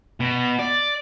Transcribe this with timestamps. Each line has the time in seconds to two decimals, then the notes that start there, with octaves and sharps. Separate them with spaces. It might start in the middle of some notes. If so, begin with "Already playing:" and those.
0.20 B2
0.59 D5